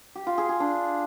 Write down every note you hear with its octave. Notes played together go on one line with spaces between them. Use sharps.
G4
F4
G#4
G#4
D4